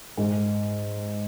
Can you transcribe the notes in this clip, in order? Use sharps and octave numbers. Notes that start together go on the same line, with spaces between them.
G#2